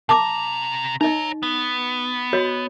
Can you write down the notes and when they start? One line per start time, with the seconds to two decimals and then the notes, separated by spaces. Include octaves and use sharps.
0.09 C3 A5 A#5 D6
1.01 D#4 C#5 D#5 A#5
1.43 B3
2.33 F#4 C#5 D#5